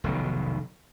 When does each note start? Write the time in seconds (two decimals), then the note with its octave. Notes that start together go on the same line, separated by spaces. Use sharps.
0.04 F1 B1 B2 D#3